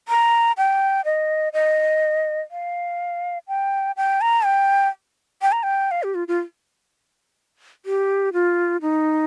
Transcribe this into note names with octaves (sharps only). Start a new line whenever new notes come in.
A#5
G5
D#5
D#5
F5
G5
G5
A#5
G5
G5
A#5
G5
F5
G4
F4
F4
G4
F4
D#4